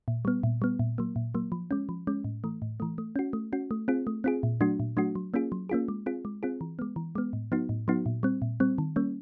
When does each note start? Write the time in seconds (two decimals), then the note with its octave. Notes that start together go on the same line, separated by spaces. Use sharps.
0.08 A#2
0.25 G3 B3
0.43 A#2
0.62 G3 B3
0.79 A#2
0.98 F#3 A#3
1.16 A#2
1.35 F#3 A#3
1.52 F3
1.71 G#3 C#4
1.89 F3
2.07 G#3 C#4
2.24 A2
2.44 E3 A3
2.62 A2
2.80 E3 A3
2.98 A3
3.16 C#4 F#4
3.33 A3
3.53 C#4 F#4
3.71 A3
3.88 C4 F4 G#4
4.07 A3
4.24 C4 F4 G#4
4.43 A#2
4.61 F#3 A3 D4 F#4
4.80 A#2
4.97 F#3 A3 D4 F#4
5.15 F#3
5.34 A#3 C#4 F4 G#4
5.52 F#3
5.69 A#3 C#4 F4 G#4
5.88 G#3
6.06 C4 F4 G#4
6.25 G#3
6.43 C4 F4 G#4
6.61 E3
6.79 G#3 B3
6.96 E3
7.15 G#3 B3
7.33 A2
7.52 F#3 B3 D#4 F#4
7.69 A2
7.88 F#3 B3 D#4 F#4
8.06 A#2
8.23 G3 C4
8.42 A#2
8.60 G3 C4
8.78 D#3
8.96 G3 A#3 C#4